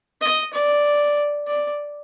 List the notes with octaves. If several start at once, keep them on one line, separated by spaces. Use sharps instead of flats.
D#5
D5
D5